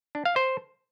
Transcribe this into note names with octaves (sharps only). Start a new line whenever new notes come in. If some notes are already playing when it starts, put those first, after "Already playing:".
D4
F5
C5